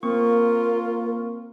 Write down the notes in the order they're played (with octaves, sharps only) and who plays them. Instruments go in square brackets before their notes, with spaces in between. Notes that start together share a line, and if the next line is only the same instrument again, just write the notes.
[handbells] A#3 C4 C#6 [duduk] F4 [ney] A#4